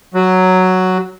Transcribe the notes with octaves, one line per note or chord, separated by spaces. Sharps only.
F#3